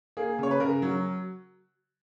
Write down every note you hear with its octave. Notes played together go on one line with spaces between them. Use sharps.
A#3 G#4
C#3 C#5
B4
C#3 A#4
F#3